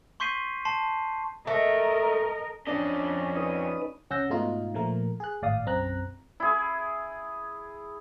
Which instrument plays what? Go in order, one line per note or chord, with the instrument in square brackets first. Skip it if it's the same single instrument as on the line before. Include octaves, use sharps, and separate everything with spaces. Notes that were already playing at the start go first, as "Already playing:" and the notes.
[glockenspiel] C6 C#6 G6 B6 C7 D#7
A5 C6 C7
[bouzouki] A3 [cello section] A#4 D#5
[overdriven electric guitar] F2 D#5 [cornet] C#4 [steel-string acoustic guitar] D4 D5
[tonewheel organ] D#4 B4 D#6
[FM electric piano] C2 C#4 F#5 E6 G6 A#6
G#2 B2 A3 D#4 F4
A#2 F3 A3 A#4
G#4 F#6
G#1 A2 D5 F5 D#6
B1 F#2 C4 A#5 F#6
[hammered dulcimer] E4 G#4